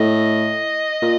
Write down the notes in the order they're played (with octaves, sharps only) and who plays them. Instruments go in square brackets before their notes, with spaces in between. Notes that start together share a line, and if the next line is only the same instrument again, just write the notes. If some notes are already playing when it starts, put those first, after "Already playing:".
Already playing: [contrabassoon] A2 [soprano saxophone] D#5
[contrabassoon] A#2